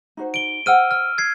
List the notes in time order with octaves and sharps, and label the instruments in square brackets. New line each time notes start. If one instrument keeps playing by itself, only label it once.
[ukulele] D#4 F#4 C5
[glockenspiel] D7 G7
[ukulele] C5 F#5 G5 [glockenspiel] E6 F6 D#7
[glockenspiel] F6
G#6 C7